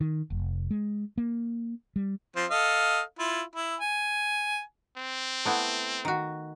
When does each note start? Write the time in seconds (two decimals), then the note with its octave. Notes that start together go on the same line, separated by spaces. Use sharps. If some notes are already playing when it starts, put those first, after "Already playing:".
0.01 D#3
0.30 F1
0.71 G#3
1.18 A#3
1.96 G3
2.36 F3 C4
2.51 A4 D#5 F5
3.19 E4 F4
3.55 E4
3.81 G#5
4.97 C4
5.45 A3 B3 E4
6.05 D#3 F#4